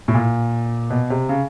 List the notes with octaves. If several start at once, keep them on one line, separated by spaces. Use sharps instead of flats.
A2
A#2
B2
C3
C#3